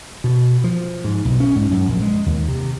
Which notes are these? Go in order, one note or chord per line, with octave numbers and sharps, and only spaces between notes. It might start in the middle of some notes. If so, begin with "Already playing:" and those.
B2
F3
G#2
B1
C#4
G#2
F#2
A#1
G#3
D#2
C3